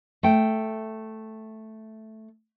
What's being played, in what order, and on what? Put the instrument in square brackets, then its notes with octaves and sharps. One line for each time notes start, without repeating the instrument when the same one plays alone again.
[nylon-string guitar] A3 G5